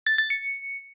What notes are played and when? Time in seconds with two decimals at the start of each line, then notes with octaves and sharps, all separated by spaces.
0.06 A6
0.18 A6
0.30 C#7